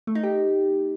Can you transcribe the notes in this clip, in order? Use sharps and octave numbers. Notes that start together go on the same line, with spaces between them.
A3
D#4
G4